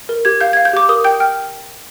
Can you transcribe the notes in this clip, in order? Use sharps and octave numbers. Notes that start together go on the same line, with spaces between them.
A#4
G4 G#6
F5 G6
F5 G#6
G6
G4 D6
A#4 D#6
G5 G6
G5 F6